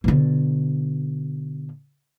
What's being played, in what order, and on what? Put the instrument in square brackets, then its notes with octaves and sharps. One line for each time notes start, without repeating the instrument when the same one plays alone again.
[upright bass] B2 D3